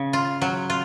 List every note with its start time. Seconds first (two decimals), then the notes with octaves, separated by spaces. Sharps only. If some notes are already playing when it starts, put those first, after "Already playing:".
Already playing: C#3
0.13 F4
0.42 F#3
0.70 F4